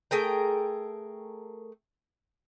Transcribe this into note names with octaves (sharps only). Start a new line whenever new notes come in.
A3 G#4 A#4 G5